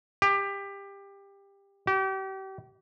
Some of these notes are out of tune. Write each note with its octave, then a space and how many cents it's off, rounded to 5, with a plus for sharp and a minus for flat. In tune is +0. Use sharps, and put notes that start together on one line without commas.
G4 +20
G4 -35